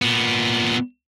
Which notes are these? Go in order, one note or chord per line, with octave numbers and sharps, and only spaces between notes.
A#2 B3